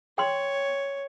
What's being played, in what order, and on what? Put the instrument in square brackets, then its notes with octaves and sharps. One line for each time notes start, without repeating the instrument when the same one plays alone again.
[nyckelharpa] C#5 [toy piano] G5 C6